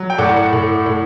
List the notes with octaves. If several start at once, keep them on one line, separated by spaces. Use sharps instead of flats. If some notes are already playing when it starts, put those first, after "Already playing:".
Already playing: F#3
G5
A2 D5 F#5
A2
A2